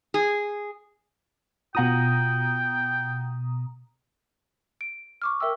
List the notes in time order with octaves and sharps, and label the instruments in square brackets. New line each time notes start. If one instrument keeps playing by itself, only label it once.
[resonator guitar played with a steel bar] G#4
[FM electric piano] B2 A#5 D#6 [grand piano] F4 F#5 [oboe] G5
[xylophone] D7
C#6 D6 F6
A#4 E5 G5 E6